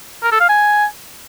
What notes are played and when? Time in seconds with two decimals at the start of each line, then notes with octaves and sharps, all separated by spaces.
0.23 A#4
0.32 A4
0.40 F5
0.49 G#5